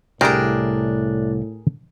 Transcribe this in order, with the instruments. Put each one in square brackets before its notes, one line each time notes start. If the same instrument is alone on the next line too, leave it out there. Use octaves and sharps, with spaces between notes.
[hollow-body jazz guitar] C2 G4 A#5 [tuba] A2 [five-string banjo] D4 [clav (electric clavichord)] G#4 A#4 G5